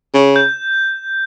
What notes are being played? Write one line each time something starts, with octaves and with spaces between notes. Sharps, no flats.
C#3
G6